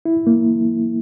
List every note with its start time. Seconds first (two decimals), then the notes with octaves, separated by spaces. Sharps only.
0.05 E4
0.27 A#3